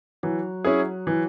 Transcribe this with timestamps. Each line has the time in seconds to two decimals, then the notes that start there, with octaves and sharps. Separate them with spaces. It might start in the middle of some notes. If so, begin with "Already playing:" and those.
0.23 E3 F#3
0.65 C#4 E4 G#4
1.07 E3